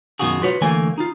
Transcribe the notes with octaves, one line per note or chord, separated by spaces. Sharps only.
F#2 B2 D#3 F4 F#4 G#4
F4 F#4 B4 C#5
D2 E3 A3 A#3 G#5
D#4 F4